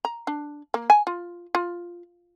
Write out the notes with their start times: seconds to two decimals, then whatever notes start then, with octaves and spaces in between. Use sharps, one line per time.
0.05 A#5
0.27 D4
0.74 A#3
0.90 G#5
1.07 F4
1.55 F4